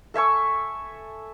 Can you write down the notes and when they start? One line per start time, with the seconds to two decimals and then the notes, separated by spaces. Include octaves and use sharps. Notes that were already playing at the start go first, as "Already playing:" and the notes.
0.14 A4 E5 G#5 C#6